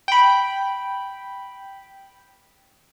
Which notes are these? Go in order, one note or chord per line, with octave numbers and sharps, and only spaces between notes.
G5 B5